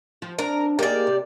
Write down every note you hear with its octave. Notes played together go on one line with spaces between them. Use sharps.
F3
C4 D4 A#4
A#3 D#4 G4 G#4 D5
C3